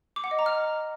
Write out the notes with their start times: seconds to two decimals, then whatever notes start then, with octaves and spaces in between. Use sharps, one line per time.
0.16 D6
0.24 F#5
0.31 D#5
0.39 A#5
0.46 F6